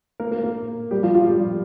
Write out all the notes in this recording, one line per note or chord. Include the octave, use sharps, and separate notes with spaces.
A#3 A#4
A#3 A#4
A#3 A#4
G3 G4
F3 F4
F3 F4
G3 G4